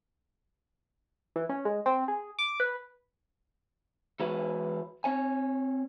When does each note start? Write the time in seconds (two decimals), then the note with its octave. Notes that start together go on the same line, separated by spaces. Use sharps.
1.36 E3
1.49 C#4
1.65 G#3
1.86 C4
2.08 G#4
2.39 D6
2.60 B4
4.20 E3 G#3 E4 F#4 B4 C#5
5.04 C4 C#5 G#5